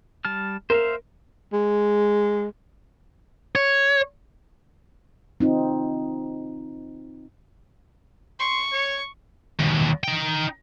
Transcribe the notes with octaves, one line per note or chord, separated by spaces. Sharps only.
G3 A5 F6
A#4 C5 E5 F5
G#3
C#5
C4 D#4 F4
C6 C#6
C#5
D#2 B2
D#4 G5